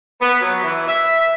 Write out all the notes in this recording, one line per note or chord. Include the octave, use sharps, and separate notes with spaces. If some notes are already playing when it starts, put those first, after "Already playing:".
B3
F#3
E3
E5